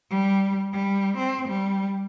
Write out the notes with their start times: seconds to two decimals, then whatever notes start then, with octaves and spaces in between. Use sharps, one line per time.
0.10 G3
0.73 G3
1.17 C4
1.48 G3